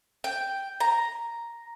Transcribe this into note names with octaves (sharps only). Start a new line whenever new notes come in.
G5
A#5